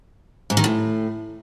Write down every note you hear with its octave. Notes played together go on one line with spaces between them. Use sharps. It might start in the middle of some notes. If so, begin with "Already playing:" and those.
G#2
D#3
A2